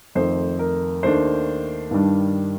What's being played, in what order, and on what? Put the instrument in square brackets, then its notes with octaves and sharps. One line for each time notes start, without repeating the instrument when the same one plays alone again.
[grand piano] F2 D#3 A3 C5
A#4
D#2 D#3 A3 D4 C5
G2 D#3 G3 D4